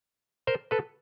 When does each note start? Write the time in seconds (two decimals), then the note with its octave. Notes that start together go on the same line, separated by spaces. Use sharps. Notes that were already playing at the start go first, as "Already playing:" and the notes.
0.47 A#4 C5
0.71 A4 B4